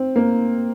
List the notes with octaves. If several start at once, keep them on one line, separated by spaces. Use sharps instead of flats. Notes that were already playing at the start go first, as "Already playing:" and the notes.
Already playing: C4
A#3